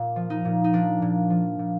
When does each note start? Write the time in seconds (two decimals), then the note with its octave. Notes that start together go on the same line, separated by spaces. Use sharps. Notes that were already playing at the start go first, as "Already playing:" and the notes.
Already playing: A#2
0.16 F3
0.30 D#4
0.45 A#2
0.64 D#4
0.73 F3 D4
1.02 A#2
1.30 F3
1.59 A#2